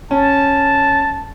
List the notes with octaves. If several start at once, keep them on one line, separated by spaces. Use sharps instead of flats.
C#4 A5